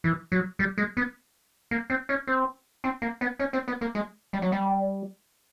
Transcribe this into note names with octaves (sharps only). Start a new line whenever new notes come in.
E3
F#3
G3
G#3
B3
A#3
C4
C#4
C4
C4
A#3
B3
C#4
C4
B3
A#3
G#3
G3
F#3
G3